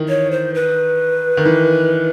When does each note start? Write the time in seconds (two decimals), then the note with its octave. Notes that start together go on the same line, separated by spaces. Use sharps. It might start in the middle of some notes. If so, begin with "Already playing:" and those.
Already playing: D#3 E3
0.09 C#5
0.31 C5
0.54 B4
1.37 D#3
1.45 E3